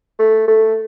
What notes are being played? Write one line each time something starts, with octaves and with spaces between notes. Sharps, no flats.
A3
A3